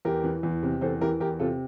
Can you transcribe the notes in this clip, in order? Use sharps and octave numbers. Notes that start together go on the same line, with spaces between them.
E2 G4 A#4
E3
E2
C3
E2 A4 C5
E3 G4 A#4
E2 G4 A#4
C3 F4 A4